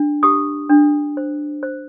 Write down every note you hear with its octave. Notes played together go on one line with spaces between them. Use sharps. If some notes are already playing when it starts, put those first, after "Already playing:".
Already playing: D4
G4 D#6
D4
C5
C5